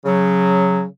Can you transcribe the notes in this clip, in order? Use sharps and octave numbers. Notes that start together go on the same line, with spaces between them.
C#3 F#3